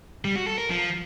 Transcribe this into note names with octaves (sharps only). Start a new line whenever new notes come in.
G3
F#4
A4
A#4
F3